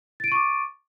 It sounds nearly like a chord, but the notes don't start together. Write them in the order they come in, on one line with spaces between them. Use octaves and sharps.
A6 D7 D#7 C#6 D6